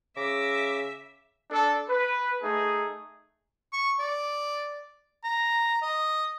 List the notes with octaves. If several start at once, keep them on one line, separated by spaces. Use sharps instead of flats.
C#3 E5 D6 A#6
D4 A4
B4
A3 D#4 G#4
C#6
D5
A#5
D#5